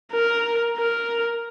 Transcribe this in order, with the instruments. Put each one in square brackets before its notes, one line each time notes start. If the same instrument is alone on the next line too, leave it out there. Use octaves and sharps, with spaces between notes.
[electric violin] A#4
A#4